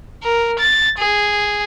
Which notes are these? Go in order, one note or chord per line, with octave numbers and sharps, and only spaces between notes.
A#4
A6
G#4